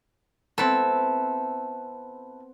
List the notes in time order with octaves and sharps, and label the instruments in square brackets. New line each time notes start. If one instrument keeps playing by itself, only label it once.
[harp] B3 C4 [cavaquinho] E4 A4